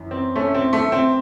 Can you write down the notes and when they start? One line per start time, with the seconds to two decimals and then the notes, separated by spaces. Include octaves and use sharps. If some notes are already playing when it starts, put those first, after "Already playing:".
Already playing: F#2 E3
0.11 C4
0.36 A3 C#4
0.55 C4
0.73 A3
0.92 C4